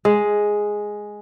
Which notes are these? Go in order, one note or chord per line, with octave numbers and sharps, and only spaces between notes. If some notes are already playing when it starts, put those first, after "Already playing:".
G#3